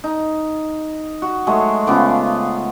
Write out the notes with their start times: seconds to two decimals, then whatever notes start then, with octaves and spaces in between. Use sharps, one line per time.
0.04 D#4
1.22 F#4
1.47 F#3 G#3 A3 G#4
1.87 C#3 F3 B3 D6